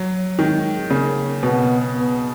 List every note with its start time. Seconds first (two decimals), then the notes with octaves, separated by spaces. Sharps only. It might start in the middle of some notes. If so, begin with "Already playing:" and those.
Already playing: F#3
0.39 D#3 G#3
0.90 C#3 A#3
1.42 B2 B3
1.94 B3